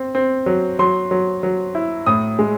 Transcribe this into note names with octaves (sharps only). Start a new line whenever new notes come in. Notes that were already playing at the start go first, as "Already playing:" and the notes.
Already playing: C4
C4
F#3
F#3 C6
F#3
F#3
E4
A2 D#6
G#3